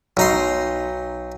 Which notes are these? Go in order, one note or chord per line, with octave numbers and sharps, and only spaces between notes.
B1 D#4 C6